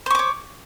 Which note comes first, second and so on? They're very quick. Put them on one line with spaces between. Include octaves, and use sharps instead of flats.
C5 C#6 D6 C#5